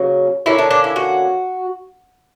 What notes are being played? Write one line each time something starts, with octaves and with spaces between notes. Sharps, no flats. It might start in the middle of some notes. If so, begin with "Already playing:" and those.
Already playing: C#3 F#3 A#3
D3 A#3 C#4 E4
D4
D4
E4
F#4